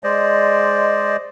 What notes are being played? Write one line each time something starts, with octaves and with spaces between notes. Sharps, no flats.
G#3 C5 D5 D#5